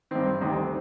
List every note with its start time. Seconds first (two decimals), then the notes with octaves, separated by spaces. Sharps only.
0.11 G2 D#3 C4
0.41 D2 C3 D#3